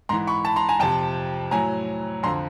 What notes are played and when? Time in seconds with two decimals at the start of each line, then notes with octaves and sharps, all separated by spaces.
0.09 G#2 E3 A#5 C6
0.27 B5 C#6
0.45 A5 B5
0.56 A#5 C6
0.69 G#5 A#5
0.80 F2 C3 F3 G5 A5
1.51 A2 F#3 G#5 A#5
2.23 F2 D3 F3 A#5 C6